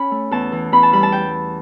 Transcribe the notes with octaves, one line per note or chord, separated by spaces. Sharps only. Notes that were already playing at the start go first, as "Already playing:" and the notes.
Already playing: C#4 B5
A3
E2 A5
E3
E2 B5
A5
G3 B5
A5
G5